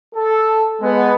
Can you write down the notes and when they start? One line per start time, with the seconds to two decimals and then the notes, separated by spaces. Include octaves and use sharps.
0.15 A4
0.81 G#3 B3